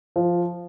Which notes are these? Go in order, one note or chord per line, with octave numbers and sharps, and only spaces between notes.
F3